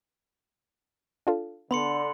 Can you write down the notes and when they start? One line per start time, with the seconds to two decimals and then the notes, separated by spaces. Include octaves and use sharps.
1.27 D4 F4 A4
1.71 D3 B3 B5 C6 C#7